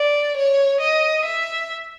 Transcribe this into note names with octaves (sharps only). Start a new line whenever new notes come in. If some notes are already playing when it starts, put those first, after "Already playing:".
Already playing: D5
C#5
D#5
E5